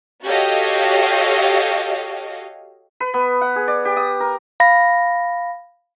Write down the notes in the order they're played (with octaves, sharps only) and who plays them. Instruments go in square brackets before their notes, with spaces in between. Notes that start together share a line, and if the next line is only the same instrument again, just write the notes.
[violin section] F#4 G4 A4 C#5 D#5 F5
[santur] B4
B3
F#5
G#4
D5
G4
D#6
A#4
[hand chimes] F5 B5 A#6